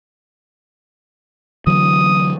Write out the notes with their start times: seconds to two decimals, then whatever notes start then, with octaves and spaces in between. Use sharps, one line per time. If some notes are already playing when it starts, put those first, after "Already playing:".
1.67 D3 E3 F#3 D#6